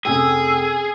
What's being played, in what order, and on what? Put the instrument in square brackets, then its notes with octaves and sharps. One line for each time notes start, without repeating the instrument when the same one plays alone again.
[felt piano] F1 C#4 G5 [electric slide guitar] G#4 [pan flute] E6